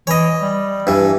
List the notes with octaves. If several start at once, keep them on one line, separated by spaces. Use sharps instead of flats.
E3 C#5 D#5
G3
G2 E3